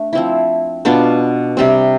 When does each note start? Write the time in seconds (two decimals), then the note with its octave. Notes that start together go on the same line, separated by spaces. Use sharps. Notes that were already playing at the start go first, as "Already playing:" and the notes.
Already playing: A3 D4
0.13 F3 C4 E4
0.85 B2 B3 D4 F4
1.57 C3 G3 C4